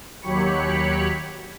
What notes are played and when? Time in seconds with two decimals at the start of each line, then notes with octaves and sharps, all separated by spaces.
0.21 D#2 F#3 G4 C#5 B5 C#7